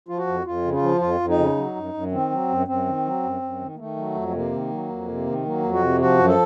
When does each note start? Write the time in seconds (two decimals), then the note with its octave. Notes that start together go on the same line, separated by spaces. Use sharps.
0.08 F3 F4
0.18 F#4
0.27 F2
0.45 F2 F4
0.65 C#3
0.74 F4
0.82 F3
1.01 F2 F4
1.20 F2
1.29 D#4
1.38 C#3
1.57 F#3
1.76 F#2
1.94 F#2
2.12 D#3 C4
2.30 F#3
2.49 F#2
2.67 F#2 C4
2.86 D#3
3.05 F#3
3.23 F#2
3.42 F#2
3.61 D#3
3.75 A#3
3.79 D#3 A3
3.97 F#3
4.16 F2
4.28 A3
4.34 C3 A#3
4.52 D#3
4.71 F#3
4.90 F2
5.08 C3
5.26 D#3
5.45 F#3 A#3
5.64 F2
5.73 F#4
5.82 C3
6.01 F3 F#4
6.18 F#2
6.28 A4